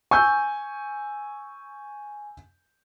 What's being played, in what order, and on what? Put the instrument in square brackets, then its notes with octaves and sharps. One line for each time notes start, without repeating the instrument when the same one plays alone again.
[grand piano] G#5 [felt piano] C#6 E6 G6